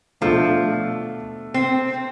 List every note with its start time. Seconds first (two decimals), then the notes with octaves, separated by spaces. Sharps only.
0.21 B2 F3 A3 D4 A4
1.54 C4